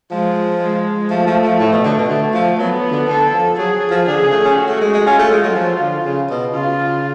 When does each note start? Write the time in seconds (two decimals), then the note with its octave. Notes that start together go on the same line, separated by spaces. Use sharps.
0.11 F3 G#3
0.60 G#3
1.10 F3 A3
1.27 F3
1.44 F3
1.59 A2
1.72 B2
1.84 D3
1.97 B2
2.08 D3 A3
2.34 F3
2.59 F#3 B3
2.91 D3
3.08 D3 A4
3.33 F3
3.58 F#3 G#4
3.91 F3
4.07 D3 G#4
4.20 C#3
4.32 A3
4.45 C#4
4.57 F#4
4.69 A3
4.81 G#3
4.94 G#3
5.07 C#4 F4
5.19 A3
5.31 G#3
5.44 F#3
5.55 F3
5.81 D3
6.05 C#3
6.30 B2
6.54 C#3 F4